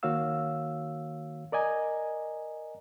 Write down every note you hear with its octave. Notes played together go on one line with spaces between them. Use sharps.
D#3 A#3 F#4 C#5 F5 E6
A#4 D5 D#5 G#5 A#5